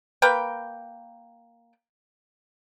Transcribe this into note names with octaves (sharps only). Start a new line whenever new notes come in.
A#3 B4 G5